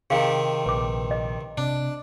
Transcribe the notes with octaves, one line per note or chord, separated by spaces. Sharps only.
C3 D#3 G#4 F5
A#1 B4 D6
D#5
C3 D4